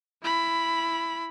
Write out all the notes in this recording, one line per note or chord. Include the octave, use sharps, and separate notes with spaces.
E4 B5